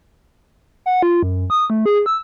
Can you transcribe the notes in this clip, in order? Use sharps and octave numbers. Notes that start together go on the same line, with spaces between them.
F#5
F4
F#2
D#6
A3
G#4
E6